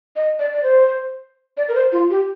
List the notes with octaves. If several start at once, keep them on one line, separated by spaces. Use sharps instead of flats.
D#5
D5
D5
C5
D5
A#4
C5
F4
G4